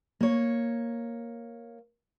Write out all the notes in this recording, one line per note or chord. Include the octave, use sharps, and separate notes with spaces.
A#3 C#5